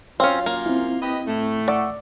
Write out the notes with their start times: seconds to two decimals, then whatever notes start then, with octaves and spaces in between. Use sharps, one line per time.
0.20 F#2 C4 C#4 F4 C#5 F5
0.46 A#3
0.66 C4 E4
1.02 G4 B4 D#5
1.27 A2 A3
1.68 D5 F#5 C#6 E6